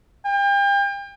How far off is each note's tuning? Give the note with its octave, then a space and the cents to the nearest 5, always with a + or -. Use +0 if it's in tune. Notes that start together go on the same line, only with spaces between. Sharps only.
G5 +35